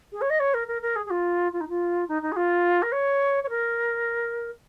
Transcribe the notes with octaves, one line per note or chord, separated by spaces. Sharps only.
G#4
C#5
D#5
C#5
A#4
A#4
A#4
G#4
G#4
F4
F4
D#4
F4
D#4
D#4
G#4
F4
A#4
C#5
C#5
A#4